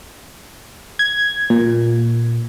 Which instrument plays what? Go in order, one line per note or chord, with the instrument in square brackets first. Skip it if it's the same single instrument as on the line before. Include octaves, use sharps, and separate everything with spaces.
[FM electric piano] G#6
A#2